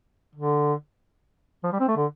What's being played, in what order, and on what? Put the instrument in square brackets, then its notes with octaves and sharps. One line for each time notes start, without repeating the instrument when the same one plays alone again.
[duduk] D3
F3
G3
C4
A3
D3